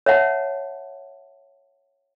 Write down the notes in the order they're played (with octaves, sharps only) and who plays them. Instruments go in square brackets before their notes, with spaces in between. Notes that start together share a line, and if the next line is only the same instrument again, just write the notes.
[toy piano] C#5 E5 F#5 A5